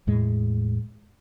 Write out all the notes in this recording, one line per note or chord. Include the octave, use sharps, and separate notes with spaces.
E2 A2 G#3